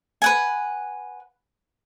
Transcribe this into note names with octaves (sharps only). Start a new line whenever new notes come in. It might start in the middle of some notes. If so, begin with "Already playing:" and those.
B4 F#5 G#5